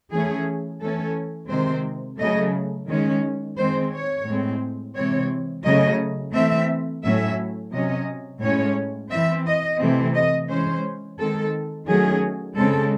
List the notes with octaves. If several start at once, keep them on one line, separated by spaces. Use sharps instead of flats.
E3 A3 C#4 G#4
E3 A3 C#4 A4
C3 D#3 G#3 C4 C5
C#3 F#3 A3 D#5
D#3 G#3 C#4
D#3 G#3 C4 C5
C#5
A2 G#3 C4
C3 E3 G#3 C4 C#5
C#3 F#3 A3 C#4 D#5
E3 A3 C4 E5
A2 F#3 A3 C#4 E5
C3 F#3 C#4 D#5
A2 G#3 C#4 C#5
E3 C4 E5
D#5
C3 E3 A3 C4
D#5
E3 G#3 C#4 C5
D#3 G#3 C4 A4
D#3 F#3 A3 C#4 G#4
C#3 G#3 C4 A4